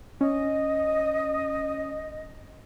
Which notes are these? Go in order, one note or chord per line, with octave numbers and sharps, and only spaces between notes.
C#4 D#5